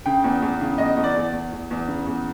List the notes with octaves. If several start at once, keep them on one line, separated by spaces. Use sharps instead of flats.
C#3 G5
E2
E2
C#3
E2 D#5
E2
D5
E2
E2
E2
E2
C#3
E2